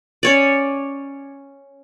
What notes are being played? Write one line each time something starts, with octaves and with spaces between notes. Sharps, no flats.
C#4 C#5 D5